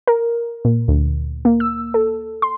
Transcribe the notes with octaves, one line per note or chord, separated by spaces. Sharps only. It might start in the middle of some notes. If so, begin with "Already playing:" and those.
A#4
A#2
D2
A#3
E6
A4
C6